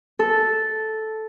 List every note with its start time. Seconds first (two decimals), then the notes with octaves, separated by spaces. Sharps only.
0.19 A4